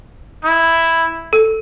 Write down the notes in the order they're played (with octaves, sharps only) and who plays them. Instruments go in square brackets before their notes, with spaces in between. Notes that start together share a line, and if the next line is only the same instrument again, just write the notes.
[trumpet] E4
[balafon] A4